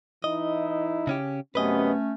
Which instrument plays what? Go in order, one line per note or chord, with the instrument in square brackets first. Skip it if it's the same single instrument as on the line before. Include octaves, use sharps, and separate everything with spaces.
[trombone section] E3 D#4 E4 [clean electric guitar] D#5
[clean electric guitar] C#3 C#4 G4
[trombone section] F#2 C3 B3 [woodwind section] A3 C#4 [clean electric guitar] B4 D#5